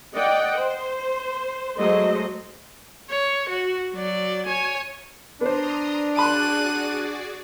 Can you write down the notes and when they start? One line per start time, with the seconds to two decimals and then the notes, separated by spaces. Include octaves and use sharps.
0.14 D5 D#5 F#5 G5
0.57 C5
1.78 F#3 G#3 A3 C5 D#5
3.10 C#5
3.49 F#4
3.94 F#3 D5
4.46 C#5 G#5
5.41 B3 D4 C5 A#5 C6 D#6
6.17 F#4 G#4 D5 A5 B5 C6 F#6 D#7